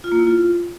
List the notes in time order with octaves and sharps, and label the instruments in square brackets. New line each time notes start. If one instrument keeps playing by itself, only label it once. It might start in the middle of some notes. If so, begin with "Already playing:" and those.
[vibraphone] F4
A#3
E4
F4